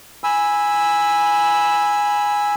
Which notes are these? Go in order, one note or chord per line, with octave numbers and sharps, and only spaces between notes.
G#5 B5 E6